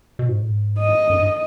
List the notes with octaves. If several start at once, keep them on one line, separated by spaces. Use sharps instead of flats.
B2
G#2
A2
G#2
D#5
F#2
G2